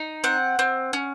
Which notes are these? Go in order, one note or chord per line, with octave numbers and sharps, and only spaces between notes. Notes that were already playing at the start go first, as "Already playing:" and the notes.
Already playing: D#4
C4 F#5
C4
C#4